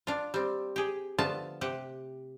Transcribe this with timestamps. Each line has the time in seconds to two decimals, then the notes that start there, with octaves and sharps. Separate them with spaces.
0.07 D4 F4
0.34 G3 C4
0.76 G4 G#4
1.18 D3 F3 A3 B3 F4 A5
1.61 C3 G4 F#5